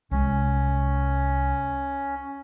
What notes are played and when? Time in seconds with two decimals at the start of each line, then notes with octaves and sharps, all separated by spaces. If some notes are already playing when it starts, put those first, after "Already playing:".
0.11 C2 G#3 C#4